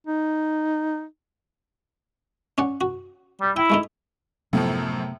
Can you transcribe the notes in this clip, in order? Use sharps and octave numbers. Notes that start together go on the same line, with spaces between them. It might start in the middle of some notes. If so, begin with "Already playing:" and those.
D#4
C#4 D5 F#5
F#4
G3
E4 G5
G#3 A3 D#4
F#2 A2 C3 F3 A3 B3